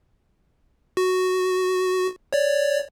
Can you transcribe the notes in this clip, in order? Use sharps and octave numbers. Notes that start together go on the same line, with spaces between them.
F#4
C#5 D5